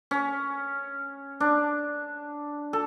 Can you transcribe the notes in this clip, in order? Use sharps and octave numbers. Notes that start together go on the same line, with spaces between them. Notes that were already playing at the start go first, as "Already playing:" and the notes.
C#4
D4
A4